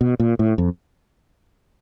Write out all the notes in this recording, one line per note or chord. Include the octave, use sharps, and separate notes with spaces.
B2
A#2
A2
F2